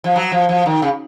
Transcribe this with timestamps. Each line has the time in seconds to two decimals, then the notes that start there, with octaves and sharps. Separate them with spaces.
0.04 F3
0.16 F#3
0.32 F3
0.49 F3
0.66 D#3
0.82 C#3